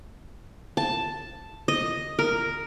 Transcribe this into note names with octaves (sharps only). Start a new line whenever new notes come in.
A5
D#5
A#4